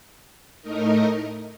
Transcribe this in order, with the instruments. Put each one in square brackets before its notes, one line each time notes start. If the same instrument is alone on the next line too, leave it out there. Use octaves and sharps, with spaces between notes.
[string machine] A2 A3 D#4 A#4 D#5